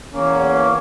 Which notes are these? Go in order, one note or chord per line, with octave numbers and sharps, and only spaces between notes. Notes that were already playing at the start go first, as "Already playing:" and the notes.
E2 A#3 C#4